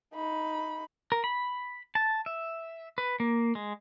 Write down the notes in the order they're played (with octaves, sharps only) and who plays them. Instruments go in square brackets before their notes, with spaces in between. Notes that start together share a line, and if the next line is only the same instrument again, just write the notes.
[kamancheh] D#4 B5
[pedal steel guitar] A#4
B5
A5
E5
B4
A#3
G#3